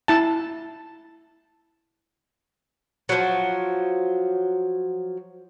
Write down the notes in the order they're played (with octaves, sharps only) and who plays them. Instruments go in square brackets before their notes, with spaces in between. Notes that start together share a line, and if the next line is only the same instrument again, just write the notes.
[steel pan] E4 A5
[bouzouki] F3 F#3